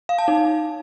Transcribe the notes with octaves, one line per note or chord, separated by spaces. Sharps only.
F5
A5
D#4